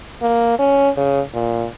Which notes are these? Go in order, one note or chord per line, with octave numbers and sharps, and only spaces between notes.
A#3
C#4
C#3
A#2